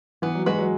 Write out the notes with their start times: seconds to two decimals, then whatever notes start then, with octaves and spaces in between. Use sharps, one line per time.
0.22 E3 B3
0.35 F#3
0.46 G#3 F#4 B4
0.59 F#3